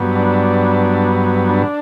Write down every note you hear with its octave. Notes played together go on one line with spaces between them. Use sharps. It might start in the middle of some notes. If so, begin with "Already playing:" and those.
Already playing: G2 F#3 B3
D4
D4